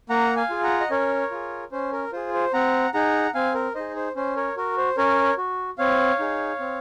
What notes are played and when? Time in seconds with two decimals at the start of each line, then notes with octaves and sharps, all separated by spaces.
0.10 A#3 F#5 A#5
0.36 F5 G#5
0.50 F4 G#4
0.63 F#5 A#5
0.81 D#5
0.91 C#4 A#4 C#5
1.31 F4 G#4
1.72 C#4 C5
1.92 A#4
2.12 F4 G#4 C5
2.34 C5
2.53 C4 F#5 A#5
2.94 D#4 G#4 F#5 A#5
3.34 C4 F5 G#5
3.55 A#4
3.75 D#4 G#4 C5 D#5
3.96 C5
4.16 C#4 C5
4.36 A#4 C#5
4.57 F#4 A#4
4.77 C5
4.97 C#4 A#4 C#5
5.38 F#4
5.78 C4 C#5 F5
6.19 D#4 G#4
6.60 C4